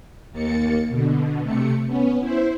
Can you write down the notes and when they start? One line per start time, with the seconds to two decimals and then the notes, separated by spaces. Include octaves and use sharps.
0.31 D#2 A#3 A6 C#7
0.89 B2 D3
1.41 C3 A3 C#7
1.86 B3 C#4
2.20 E4 C5